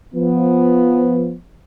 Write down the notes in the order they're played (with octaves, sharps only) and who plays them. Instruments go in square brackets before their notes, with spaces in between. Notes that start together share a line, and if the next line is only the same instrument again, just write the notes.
[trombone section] F3 B3